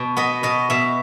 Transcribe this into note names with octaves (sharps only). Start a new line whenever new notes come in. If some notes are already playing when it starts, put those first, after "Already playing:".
Already playing: B2
B3 D#5
B2 D#5
B2 E5